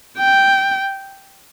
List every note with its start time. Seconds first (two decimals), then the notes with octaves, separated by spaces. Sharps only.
0.18 G5